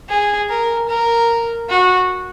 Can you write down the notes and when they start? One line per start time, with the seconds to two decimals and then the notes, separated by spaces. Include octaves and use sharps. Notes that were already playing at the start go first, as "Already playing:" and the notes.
0.08 G#4
0.49 A#4
0.89 A#4
1.69 F#4